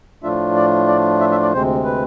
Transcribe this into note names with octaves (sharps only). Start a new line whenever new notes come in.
A2 F3 A3 D4 F4 E5
D5
D5
E5
E5
D5
D2 C3 G#3 C4 C5
B4